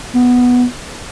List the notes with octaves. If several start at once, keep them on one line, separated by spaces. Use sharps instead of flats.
B3